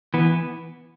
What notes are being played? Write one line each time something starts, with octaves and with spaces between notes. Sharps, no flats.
E3 B3